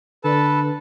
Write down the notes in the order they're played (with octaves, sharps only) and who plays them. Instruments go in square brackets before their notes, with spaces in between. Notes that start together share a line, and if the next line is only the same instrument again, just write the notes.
[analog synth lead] D3 [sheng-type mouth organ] A4 B4 A5